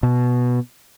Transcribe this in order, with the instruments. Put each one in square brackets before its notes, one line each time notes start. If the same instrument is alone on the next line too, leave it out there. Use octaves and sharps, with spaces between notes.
[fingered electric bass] B2